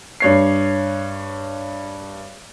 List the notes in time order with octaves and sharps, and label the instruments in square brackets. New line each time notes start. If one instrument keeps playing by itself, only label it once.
[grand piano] G2 C#5 C7